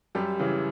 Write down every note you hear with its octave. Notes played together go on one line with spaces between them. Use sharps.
F#2 G3 G4
C#3 E3